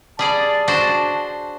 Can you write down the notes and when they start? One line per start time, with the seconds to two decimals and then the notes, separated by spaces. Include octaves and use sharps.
0.19 G3 G#4 D5 A5
0.68 D4 F#4 C5